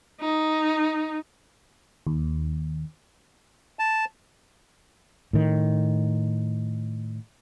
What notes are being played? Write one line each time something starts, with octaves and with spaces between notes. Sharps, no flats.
D#4
D#2
A5
A2 D#3